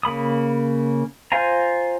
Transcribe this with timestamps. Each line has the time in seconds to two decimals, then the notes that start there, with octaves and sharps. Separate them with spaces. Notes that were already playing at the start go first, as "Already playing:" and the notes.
0.03 C#3 A#3 B5 D#6
1.32 F4 C5 F5 G#5 A#5